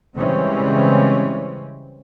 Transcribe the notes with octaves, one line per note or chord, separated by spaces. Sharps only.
C#3 E3 G3 G#3 C4 C#4